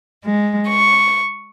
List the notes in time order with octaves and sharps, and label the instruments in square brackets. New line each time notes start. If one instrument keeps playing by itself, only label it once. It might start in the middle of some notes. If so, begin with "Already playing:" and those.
[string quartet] G#3
C#6